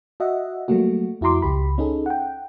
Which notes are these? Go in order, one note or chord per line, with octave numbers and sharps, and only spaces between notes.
F#4 D#5 E5 F#5
F#3 G3 A3 A#3 F#4
F2 E4 F#4 A#5 C6 D6
C#2 G4 B5
C#4 D#4 G#4 A4
F#5 G5